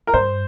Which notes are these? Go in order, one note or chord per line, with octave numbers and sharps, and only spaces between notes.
A#4
G2 C5